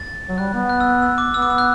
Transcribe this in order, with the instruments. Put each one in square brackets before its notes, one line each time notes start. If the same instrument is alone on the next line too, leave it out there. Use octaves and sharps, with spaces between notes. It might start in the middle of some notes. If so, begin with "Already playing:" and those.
Already playing: [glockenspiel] A6
[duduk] F#3
[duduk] G3 [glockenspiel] F#6
[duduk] B3
[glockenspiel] F#6
E6
F#6
E6
D6
[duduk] B3 [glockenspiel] E6
[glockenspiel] D6
E6
F#6